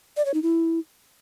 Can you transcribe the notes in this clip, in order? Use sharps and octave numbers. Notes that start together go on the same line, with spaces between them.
D5
C#5
D#4
E4